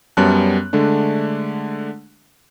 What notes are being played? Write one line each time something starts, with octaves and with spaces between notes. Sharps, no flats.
F#2 G3 B3 C#4 A5 F#6
D3 G#3 A3 D4